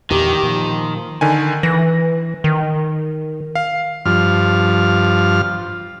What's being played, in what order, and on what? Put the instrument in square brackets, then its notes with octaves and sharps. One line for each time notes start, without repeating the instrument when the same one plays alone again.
[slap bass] E2 A#2 D3 [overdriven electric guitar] D#3 [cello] G4
[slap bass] A#2 [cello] F3
[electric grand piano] D3 D#3 G#5
[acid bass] E3 [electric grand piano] A#6
[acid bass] D#3
[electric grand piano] F5
[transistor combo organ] G2 F3 F6